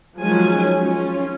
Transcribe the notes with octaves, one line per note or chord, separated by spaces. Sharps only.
D#3 F3 F#3 G#3 C#4 G#5
C#4 F4